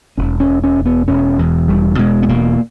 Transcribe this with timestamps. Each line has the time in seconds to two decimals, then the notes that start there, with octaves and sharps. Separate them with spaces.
0.17 E1 C#4
0.40 C#4
0.48 E1
0.64 C#4
0.78 E1
0.86 B3
1.08 E1 C#4
1.39 E2
1.68 E1 G3
1.99 B2 G#3
2.22 B3
2.28 E1 A#3